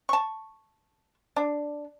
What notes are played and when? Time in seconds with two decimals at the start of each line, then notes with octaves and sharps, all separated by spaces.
0.09 A5 C#6
1.36 D4